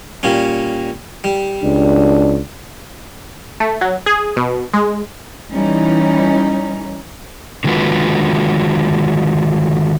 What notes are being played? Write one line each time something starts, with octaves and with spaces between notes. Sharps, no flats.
A#2 G3 C#4
G3
C#2 D4
A3
F#3
G#4
B2
G#3
E3 G3 C#4 D#4
D3 D#3 G#3 F4 F#4 B4